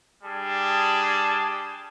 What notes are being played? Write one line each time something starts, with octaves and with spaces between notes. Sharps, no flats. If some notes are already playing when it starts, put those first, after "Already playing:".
G3 D4 G#4 A5